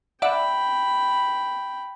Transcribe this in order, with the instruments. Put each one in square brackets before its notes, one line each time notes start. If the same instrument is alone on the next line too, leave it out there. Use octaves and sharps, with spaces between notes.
[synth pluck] D5 E5 F#5 [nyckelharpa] G5 B5